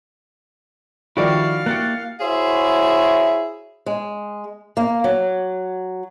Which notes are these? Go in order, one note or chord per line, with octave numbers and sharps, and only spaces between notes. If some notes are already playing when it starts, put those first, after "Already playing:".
D#3 F3 G3 E4 F#4 D5 F5
A#3 E4 G4 F#6 A6 C#7
E4 F#4 G#4 C5 C#5 E5
G#3
A#3
F#3